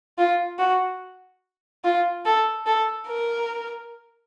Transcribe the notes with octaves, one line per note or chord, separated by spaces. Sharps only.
F4
F#4
F4
A4
A4
A#4